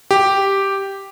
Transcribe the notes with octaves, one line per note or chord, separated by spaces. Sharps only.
G4